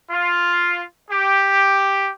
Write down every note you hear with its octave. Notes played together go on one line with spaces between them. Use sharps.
F4
G4